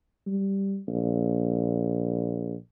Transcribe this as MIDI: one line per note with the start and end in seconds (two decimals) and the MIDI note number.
0.27 0.79 55
0.88 2.55 34